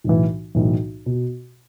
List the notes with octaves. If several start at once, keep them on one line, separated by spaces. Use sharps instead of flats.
B1 A2 E3
B1 A2 E3
B2